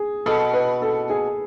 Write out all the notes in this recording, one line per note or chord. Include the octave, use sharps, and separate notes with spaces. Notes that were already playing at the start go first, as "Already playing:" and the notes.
Already playing: G#4
B2 A4
B4
A4
G#4